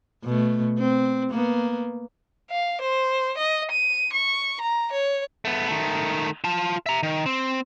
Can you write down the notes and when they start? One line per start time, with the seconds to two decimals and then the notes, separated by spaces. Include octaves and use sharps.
0.24 B2 A3
0.78 C4
1.30 A#3 B3
2.51 F5
2.81 C5
3.38 D#5
3.71 D#7
4.13 C#6
4.61 A#5
4.92 C#5
5.45 A3 B3
5.68 D#3 A3
6.44 F4 A5
6.86 E5 A#5
7.03 D#3
7.26 C4